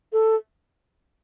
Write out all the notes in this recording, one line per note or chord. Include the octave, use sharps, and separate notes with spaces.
A4